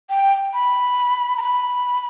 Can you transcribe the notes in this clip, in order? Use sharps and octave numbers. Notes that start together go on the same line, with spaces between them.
G5
B5
A#5
B5